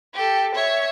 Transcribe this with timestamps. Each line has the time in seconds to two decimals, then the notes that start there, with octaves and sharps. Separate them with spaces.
0.14 G4 A4
0.55 C#5 E5